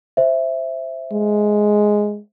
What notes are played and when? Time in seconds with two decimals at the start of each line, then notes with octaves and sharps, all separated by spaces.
0.17 C5 E5
1.13 G#3